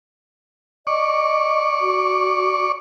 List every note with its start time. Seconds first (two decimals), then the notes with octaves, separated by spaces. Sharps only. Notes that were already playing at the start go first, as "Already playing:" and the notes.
0.87 D5 D#5 C#6
1.81 F#4